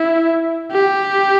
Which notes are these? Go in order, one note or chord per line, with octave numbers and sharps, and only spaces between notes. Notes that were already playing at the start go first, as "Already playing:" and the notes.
Already playing: E4
G4